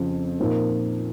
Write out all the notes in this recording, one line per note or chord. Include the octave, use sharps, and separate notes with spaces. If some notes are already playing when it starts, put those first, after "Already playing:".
Already playing: F2 C#3 F3 C4
A#2 F3 A#3 D#4